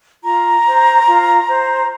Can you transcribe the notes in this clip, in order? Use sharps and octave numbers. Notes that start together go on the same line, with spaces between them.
F4 A#5
C5
F4
C5